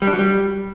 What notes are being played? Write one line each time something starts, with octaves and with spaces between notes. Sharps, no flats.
G3
D4
F#3
G3